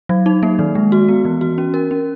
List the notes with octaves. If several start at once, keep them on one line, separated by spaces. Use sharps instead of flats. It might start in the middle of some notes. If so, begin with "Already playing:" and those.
F#3
D#4
A#3
D#3
G#3
F#4
B3
E3
F#4
C#4
A#4
C#4